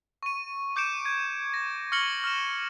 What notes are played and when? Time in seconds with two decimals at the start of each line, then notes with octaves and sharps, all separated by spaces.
0.23 C#6 D#7
0.76 D6 G6 C#7 D7 E7
1.05 G#6
1.54 A#6
1.92 C#6 F6 A#6 C#7 F#7 G7
2.24 F6 E7